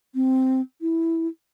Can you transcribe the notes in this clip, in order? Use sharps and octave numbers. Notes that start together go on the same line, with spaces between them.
C4
E4